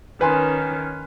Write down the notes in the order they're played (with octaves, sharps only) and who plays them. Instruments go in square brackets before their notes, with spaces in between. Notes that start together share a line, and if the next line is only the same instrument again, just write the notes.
[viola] D#3 C#4 [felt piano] B4 G#5 C6